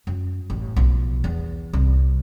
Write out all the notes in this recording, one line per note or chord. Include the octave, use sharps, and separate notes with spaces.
F#2
A1
B1 F3
E2
C2